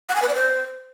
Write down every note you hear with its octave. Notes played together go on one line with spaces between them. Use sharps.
F#5
G#5
B4
D5
C5